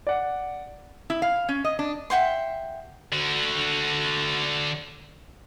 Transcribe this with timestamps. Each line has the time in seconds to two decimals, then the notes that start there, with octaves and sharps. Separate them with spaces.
0.07 D5 F#5
1.10 E4
1.22 F5
1.49 C#4
1.65 D#5
1.79 D4
2.10 E5 F#5 G5 C6
3.13 D3 F#4